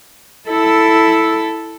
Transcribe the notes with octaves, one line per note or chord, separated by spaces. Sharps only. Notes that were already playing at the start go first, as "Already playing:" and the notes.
E4 A4